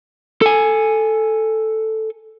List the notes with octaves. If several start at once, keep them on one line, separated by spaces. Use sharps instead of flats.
A4 G#5